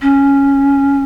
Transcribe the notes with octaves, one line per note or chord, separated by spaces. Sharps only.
C#4